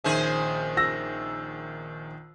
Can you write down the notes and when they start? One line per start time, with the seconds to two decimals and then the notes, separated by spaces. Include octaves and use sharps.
0.04 A#1 D#3 C#4 G#4 C5 E5
0.77 E6 A#6